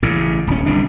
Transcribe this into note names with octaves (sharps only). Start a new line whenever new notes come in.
A1 A2 C#3
D#1 C#4
G1 C2 B2 D4